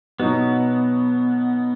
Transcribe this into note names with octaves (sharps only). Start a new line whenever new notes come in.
B2 F#3 B3 D#4 F#4